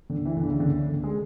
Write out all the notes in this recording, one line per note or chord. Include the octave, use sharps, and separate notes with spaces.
D3
E3
D3
C#3
D3
D3
G#3